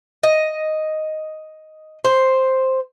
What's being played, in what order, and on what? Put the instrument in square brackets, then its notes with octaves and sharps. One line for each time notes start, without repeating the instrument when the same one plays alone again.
[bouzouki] D#5
C5